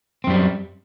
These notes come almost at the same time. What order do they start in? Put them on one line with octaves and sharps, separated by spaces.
C4 F#2 G3